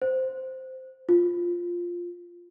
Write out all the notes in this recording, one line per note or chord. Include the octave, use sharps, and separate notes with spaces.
C5
F4